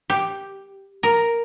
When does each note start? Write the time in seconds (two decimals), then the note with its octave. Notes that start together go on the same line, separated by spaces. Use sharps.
0.10 G4
1.03 A#4